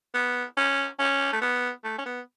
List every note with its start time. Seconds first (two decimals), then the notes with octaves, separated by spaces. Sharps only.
0.14 B3
0.57 C#4
0.99 C#4
1.33 A3
1.41 B3
1.84 A3
1.98 C#4
2.05 B3